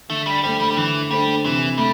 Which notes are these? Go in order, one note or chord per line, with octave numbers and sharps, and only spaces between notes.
D3 A3
G3
G3 A3 D4 A4 C5
G3
G3
D3 E3
G3 A3 D4 A4 C5
C3 E3
G3 A3